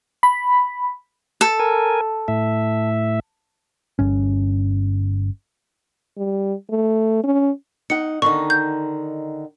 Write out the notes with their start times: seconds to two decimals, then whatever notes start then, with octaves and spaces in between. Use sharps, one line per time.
0.23 B5
1.41 A4
1.59 A#4 G#5
2.28 A2 E5
3.99 G1 C#4
6.18 G3
6.70 A3
7.24 C#4
7.90 D#4 F#5 C#7
8.22 D3 D#3 D#4 C#6
8.50 G6